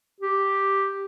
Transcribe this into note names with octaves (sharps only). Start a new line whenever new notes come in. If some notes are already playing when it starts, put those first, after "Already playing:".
G4